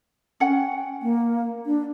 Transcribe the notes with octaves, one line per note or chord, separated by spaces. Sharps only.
C#4 F#5 G5
A#3
D4